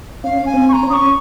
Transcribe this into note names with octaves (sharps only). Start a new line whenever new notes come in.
C#4 F5
G#5
C4
C#6
A#5
C#4
D#6
C#6